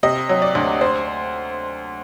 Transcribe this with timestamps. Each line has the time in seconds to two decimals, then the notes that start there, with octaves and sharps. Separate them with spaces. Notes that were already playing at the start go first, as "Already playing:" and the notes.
0.03 C3 D#5
0.29 F#3
0.42 D5
0.55 D2
0.81 C5